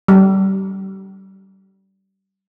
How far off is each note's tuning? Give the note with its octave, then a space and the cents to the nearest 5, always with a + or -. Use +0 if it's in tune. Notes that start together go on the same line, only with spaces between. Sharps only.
G3 -30